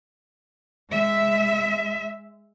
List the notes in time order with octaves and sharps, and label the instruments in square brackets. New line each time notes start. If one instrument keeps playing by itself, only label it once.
[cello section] G#3 E5